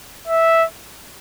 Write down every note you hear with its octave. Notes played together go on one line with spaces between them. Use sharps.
E5